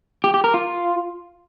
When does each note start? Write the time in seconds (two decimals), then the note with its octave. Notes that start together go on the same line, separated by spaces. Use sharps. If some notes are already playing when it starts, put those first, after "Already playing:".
0.24 G4
0.34 G4
0.44 A#4
0.54 F4